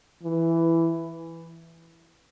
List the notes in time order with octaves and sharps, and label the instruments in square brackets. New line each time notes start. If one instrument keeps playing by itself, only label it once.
[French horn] E3